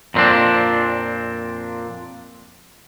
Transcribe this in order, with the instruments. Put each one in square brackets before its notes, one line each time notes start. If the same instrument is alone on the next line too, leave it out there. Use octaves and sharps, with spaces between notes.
[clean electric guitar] F2 A#2 A3 C4 D4